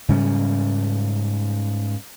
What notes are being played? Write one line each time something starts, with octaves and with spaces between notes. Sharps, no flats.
G#2 C#3 G3 C#4